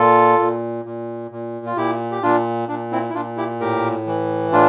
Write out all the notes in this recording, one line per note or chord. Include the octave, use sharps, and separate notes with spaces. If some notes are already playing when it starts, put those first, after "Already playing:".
Already playing: A#2 F4 A4
A#2
A#2
A#2
F4
A#2 E4 G4
G4
A#2 D4 F4
A#2 D4
C4 E4
E4
A#2 D4 F4
E4 G4
A2 G4 A#4
E3
A2 D4 F4